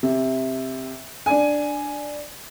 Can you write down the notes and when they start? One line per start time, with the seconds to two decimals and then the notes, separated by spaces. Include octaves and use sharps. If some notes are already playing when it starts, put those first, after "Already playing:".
0.03 C3
1.26 D4 G#5